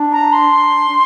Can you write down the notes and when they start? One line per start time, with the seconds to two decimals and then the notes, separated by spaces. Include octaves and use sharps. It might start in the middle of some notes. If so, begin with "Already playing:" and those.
Already playing: D4
0.12 A#5
0.32 C6